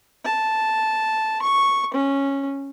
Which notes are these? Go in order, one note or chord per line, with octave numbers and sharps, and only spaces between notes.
A5
C#6
C#4